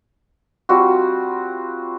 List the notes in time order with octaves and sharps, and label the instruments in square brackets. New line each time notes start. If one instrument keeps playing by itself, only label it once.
[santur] G3 C4 F4 F#4